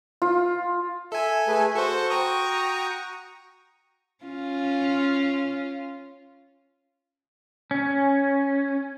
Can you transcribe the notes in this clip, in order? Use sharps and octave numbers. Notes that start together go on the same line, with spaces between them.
F4
A4 E5 G#5
A3 G#4 B4
F#4 A4 C5 C#6
G5 A#5 D#6
C#4 F4
C#4